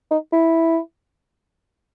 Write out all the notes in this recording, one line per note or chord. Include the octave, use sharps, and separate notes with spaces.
D#4
E4